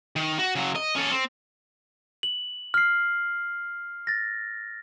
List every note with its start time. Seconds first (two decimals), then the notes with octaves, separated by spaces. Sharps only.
0.16 D#3
0.39 F#4
0.55 C#3 F#3
0.76 D#5
0.96 C#4 A4
1.11 C4
2.23 F#7
2.74 F6 C7
4.07 A6 A#6